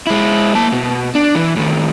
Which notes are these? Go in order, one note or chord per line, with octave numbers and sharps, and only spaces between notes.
G#3 E4
A#3 A5
B2
D4
E3
A2 D#3